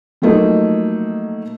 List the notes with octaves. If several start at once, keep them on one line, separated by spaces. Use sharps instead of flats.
F3 F#3 A3 A#3 D#4